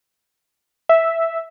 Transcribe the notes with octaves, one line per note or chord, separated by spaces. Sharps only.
E5